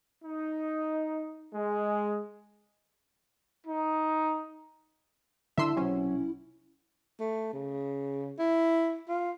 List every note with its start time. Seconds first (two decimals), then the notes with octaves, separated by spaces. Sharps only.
0.24 D#4
1.54 G#3
3.66 D#4
5.58 D3 D4 E4 E5 C6 E6
5.76 B1 C3 F#3 C#4
7.20 A3
7.53 C#3
8.39 E4
9.09 F4